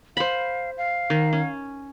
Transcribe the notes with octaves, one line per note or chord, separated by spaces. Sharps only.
C5 F5 B5
F5
D#3
C#4